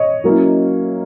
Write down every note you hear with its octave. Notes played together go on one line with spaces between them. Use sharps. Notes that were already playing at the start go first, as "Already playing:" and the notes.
Already playing: C#5 D#5
F#3 A#3 C#4 E4